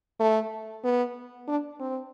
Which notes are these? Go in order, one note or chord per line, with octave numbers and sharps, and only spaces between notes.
A3
B3
D4
C4